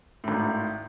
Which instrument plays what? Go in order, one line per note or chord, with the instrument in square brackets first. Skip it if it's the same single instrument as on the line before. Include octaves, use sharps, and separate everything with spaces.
[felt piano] G#1 A2